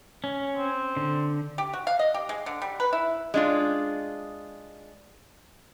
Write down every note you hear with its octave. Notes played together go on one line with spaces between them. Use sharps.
C#4
C4
D3
G4
F#4
F5
D#5
G4
G#3
D3
G3
B4
E4
G#3 D4 F4